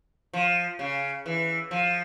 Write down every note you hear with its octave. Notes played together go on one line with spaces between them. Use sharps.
F3
C#3
E3
F3